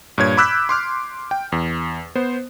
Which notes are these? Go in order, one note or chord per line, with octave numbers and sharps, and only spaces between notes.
G2 A#2 C#5 G#6
B5 D6 E6 F#6 G6 B6
C6 D6 F6
G5
E2
B3 C5